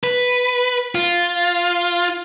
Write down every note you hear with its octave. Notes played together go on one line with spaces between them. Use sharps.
B4
F4